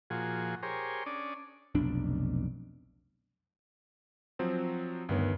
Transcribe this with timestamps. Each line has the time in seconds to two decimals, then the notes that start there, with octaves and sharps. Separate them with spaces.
0.10 A#2 F3 F#4 G#4
0.63 G4 G#4 A#4 C5 C#5
1.06 C#4 D4 D5 D#6
1.75 F1 B1 D4
4.39 F3 F#3 C4
5.09 D2 G2 D#3 B3 C#5